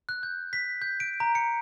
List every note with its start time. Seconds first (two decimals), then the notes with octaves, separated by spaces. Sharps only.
0.09 F#6
0.23 G6
0.53 B6
0.82 G6
1.00 D7
1.20 A#5
1.35 C#7